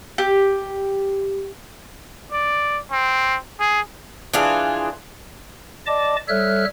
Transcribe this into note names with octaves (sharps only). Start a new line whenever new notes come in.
G4
D5
C4
G#4
E3 D4 F4 G#4
D5 D#5 A5 D6
G3 A4 C#5 E5 F6 F#6